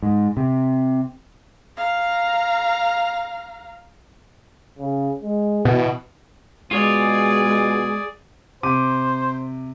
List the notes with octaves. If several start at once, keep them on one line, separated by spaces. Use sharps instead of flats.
G#2
C3
F5 A#5
C#3
G#3
B2 E3
B2 G#3 F4 G#4 C#5 D5
C3 C5 D6 D#7